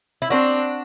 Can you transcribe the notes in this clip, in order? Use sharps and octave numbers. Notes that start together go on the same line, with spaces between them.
E4
C4 D4 F#4